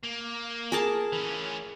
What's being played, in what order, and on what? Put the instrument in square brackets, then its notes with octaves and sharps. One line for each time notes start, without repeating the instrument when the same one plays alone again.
[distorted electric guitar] A#3
[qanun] G#4 A#4 A5
[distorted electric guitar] E3 C#4